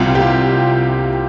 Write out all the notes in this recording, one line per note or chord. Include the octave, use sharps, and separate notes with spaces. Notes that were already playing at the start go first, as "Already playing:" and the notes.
Already playing: C2 C3 G3 F4
G4